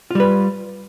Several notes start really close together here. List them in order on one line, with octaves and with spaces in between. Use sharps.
F4 G3 B4